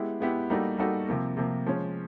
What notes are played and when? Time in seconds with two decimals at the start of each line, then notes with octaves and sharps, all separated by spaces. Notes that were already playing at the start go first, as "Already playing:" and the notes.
Already playing: G#3 B3 E4 G4
0.20 G#3 B3 E4 G4
0.50 G3 A#3 D#4 F#4 A4
0.78 G3 A#3 D#4 F#4 A4
1.08 C3 F3 A#3
1.37 C3 F3 A#3
1.66 F3 G#3 C#4